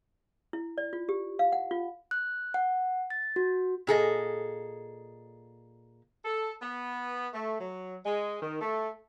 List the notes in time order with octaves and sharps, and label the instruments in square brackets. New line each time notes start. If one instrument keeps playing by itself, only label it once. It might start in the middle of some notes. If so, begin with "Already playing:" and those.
[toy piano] E4
D5
F4
G4
F5
F#5
F4
[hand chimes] F#6
F#5
A6
F#4
[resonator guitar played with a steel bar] A#2 G#4 A4 D#5
[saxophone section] A4
B3
A3
F#3
G#3
D#3
A3